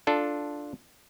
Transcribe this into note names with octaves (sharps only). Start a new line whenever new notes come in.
D4 F4 A4